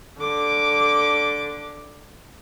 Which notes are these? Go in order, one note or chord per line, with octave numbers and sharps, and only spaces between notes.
D3 D6